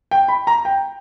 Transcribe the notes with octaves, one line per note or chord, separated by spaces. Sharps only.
G5
B5
A#5
G5